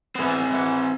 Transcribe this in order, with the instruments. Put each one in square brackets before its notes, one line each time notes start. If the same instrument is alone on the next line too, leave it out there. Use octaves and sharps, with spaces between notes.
[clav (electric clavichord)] E3 B3 [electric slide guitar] C4 G#4
[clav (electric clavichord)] E3 F#5